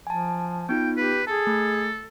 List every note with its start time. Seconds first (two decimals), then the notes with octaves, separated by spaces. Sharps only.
0.07 F3 G#5 A5
0.69 B3 D#4 F4 G5
0.97 G4 B4
1.27 G#4 A4 A5
1.47 A3